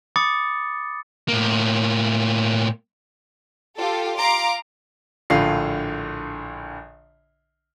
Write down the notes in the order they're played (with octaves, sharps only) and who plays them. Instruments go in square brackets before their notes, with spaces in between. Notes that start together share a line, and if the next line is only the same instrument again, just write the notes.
[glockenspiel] B5 D6 D#6 A6 C#7
[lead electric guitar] A2 A#3
[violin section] F4 G4 A4
F5 A#5 C6 D6
[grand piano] A#1 A2 D3 F4 C7